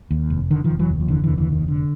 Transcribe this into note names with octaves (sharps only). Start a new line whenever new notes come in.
D#2
F1
D3 D#3
D#3 F3
F1
E3 F#3
D#2
F3
F1 D3 E3
D#2 D3 E3
D3 E3
F1 D#3
D3